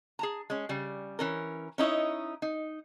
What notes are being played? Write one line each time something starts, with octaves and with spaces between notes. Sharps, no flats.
G#4 A5 A#5
G#3 C#4
C#3 G3
E3 C#4 A#4
C#4 D#4 E4 C#5 D#5
D#4